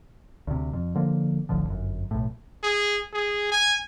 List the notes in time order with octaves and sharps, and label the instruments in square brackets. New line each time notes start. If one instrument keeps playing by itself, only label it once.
[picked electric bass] D2 C3
F2
D3 F3 A#3
D1 A1 D3 F3
G1 F#2
B1 A2
[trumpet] G#4
G#4
G#5